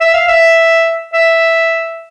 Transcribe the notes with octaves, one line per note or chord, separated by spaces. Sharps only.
E5
F5
E5
E5